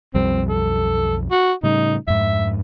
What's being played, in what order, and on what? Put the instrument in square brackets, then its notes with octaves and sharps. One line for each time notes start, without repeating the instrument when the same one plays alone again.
[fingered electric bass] B1 F2 G3 [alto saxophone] C4
[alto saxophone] A4
F#4
[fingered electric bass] A2 C#3 G3 [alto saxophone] D#4
[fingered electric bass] F2 G#2 [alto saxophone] E5